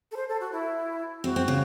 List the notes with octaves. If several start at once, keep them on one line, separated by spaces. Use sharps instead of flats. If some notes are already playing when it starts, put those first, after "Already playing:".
A4
C5
A4
F#4
E4
C4 F#4
C4
C#3